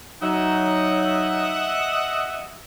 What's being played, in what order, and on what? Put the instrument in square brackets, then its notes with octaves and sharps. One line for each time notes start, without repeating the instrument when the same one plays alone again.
[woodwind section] F#3 D#4 [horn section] D#5 E5 F#5